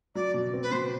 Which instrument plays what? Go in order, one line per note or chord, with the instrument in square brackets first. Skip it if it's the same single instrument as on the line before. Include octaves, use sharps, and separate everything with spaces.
[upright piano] F#3 [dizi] D5
[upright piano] B2
C4
[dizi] B4
[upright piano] B2 [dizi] C5